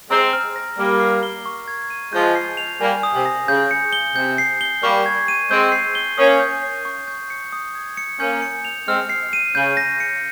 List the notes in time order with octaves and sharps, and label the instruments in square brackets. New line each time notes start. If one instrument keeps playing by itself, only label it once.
[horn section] G#3 C4 [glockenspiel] A#5
[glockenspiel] F6
A#6
[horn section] G3 A#3 [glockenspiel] F6
[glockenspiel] C7
G7
C#6
G#6
D#7
[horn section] F3 G#3 [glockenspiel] G6
[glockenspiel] C7
F7
[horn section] G3 A#3 [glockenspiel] G#5
[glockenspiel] D#6
[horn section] C3
[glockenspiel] A#6
[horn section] C#3 [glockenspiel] G6
[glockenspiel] C#7
G7
[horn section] C3 [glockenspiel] G6
[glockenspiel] C7
G7
[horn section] G3 A#3 [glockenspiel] C#6
[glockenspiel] G#6
D#7
[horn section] G#3 C4 [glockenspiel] G6
[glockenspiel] C7
G7
[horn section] A#3 C#4 [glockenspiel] D#6
[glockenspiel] G6
C7
C#6
G6
C#7
D#6
G#6
C#7
[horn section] A#3 C#4 [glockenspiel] G6
[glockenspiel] C#7
F7
[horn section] G#3 C4 [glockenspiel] F6
[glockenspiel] C7
D#7
[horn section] C#3 [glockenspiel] G6
[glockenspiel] A#6
C#7